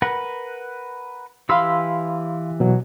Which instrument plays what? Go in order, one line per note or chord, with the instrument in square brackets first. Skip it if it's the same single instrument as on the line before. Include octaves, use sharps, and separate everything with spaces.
[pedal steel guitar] A#4 B4 F#5
[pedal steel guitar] E3 G4 E6 [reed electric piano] F5 B5 C6
[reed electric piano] B2 F#3